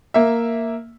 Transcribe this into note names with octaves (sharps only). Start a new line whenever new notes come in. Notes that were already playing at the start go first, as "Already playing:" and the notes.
A#3 E5